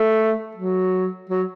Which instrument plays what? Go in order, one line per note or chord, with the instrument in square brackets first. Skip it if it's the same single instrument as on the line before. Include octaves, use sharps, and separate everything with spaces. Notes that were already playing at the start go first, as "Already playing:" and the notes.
Already playing: [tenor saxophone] A3
F#3
F#3